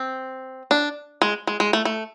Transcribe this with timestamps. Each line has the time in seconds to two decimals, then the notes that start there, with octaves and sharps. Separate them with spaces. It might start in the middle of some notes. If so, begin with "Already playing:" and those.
Already playing: C4
0.71 D4
1.22 G#3
1.47 G#3
1.60 G#3
1.73 A3
1.85 A3